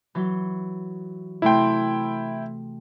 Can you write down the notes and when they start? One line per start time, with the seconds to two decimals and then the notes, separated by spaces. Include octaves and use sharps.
0.15 E3 F#3
1.42 C3 A3 E4 G5 C6